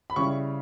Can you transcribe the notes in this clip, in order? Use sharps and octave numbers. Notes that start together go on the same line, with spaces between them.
B5
C#3 G3 C#4 E4 C#6